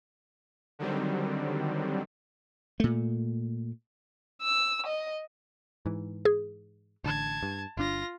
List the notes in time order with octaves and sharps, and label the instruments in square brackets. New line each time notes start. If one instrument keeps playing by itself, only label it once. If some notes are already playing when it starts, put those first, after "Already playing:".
[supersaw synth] D3 D#3 F#3 G3 C4
[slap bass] A#2 A3
[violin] E6
D#5
[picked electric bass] G#2 E3
[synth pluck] G#4
[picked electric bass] A1 D3 [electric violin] A5 G#6
[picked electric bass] G2
[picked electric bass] G1 D4 [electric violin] F4 A#6